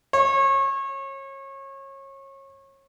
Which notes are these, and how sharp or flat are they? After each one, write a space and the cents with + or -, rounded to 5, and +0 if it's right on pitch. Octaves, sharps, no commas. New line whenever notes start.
C#5 -30